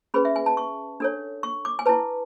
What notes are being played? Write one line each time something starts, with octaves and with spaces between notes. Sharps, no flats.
C#4 G#4 B4 B5
E5
G#5
A5
C#6
D4 A4 C#5
C#6
D6
G#5
E4 B4 A5